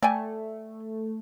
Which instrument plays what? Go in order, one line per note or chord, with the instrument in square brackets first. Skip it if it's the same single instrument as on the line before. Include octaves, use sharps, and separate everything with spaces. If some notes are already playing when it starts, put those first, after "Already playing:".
[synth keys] A3 [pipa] D5 G5 G#5